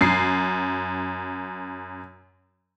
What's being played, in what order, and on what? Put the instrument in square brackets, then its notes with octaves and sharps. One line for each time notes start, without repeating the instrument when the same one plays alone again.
[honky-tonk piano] F#2 C7